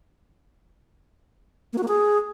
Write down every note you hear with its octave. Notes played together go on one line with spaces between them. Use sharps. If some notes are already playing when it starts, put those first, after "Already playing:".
A#3
F#4
A#3
G#4